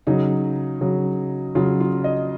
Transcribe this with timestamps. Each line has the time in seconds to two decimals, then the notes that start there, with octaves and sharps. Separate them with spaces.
0.07 C#3 F#3 D#4
0.81 C#3 F#3
1.55 C#3 F#3 F4
1.80 F4
2.04 D#5